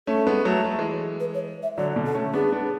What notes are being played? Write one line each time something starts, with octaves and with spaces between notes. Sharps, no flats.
A3 C#4 A4
G#3 B3
F#3 A3
G#3
A3
E3 G#3
B4
C#5
E5
D3 F#3 D5
B2 D3
A4
A3 C#4
B3 D4 G#4
B3 D4